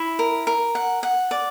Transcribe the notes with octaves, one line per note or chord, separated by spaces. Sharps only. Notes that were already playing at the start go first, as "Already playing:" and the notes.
Already playing: E4
A#4
A#4
F#5
F#5
D5